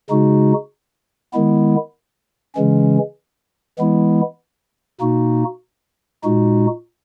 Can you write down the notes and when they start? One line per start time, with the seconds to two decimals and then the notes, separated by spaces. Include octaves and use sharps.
0.10 C#3 G#3 D#4 F#4
1.34 D#3 G#3 B3 E4
2.55 C#3 E3 G#3 C#4
3.79 E3 G#3 B3 E4
5.01 B2 A#3 D#4 F#4
6.24 A#2 G#3 D#4 F#4